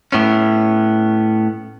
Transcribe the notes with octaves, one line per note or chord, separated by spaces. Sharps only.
A2 B3 C#4